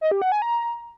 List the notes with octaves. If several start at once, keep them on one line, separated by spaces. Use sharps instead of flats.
D#5
G4
F#5
G#5
A#5